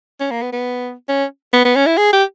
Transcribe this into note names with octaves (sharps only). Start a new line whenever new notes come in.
C#4
A#3
B3
B3
C#4
B3
B3
C#4
E4
G#4
G4